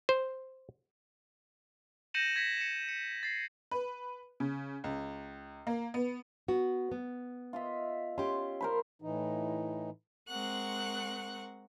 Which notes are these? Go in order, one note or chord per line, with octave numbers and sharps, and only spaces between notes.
C5
G6 A#6 C#7 D#7 E7 F#7
G#6 A#6 B6 C#7
C#7 E7
C#7
A6 C7
B4
C#3
C#2
A#3
B3
B3 F#4
B3
F4 D#5 E5
C#4 G4 C6
A#4 C5 B5
A2 E3 D#4
G#3 C4 A#4 F#5 C#6 F#6